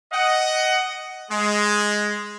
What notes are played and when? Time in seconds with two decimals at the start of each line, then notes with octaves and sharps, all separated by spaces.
0.12 D#5 F#5
1.31 G#3